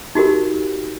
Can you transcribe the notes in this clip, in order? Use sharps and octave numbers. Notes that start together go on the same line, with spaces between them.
D#4 F#4 G4 A#4